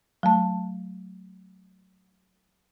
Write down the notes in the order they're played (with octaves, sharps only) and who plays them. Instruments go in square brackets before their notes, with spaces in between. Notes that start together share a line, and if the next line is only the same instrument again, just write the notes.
[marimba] F#3 A3 A5